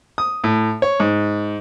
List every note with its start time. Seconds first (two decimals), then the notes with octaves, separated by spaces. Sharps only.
0.18 D#6
0.44 A2
0.82 C#5
1.00 G#2